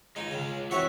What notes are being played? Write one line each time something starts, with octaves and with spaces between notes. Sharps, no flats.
G#3 D#4 F4
C#3
E3 C4 F#4 C#5 E5 F#5